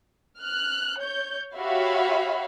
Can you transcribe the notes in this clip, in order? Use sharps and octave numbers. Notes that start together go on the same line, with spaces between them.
F6 F#6
C#5 G6
F#4 G4 C#5 E5 F5 B5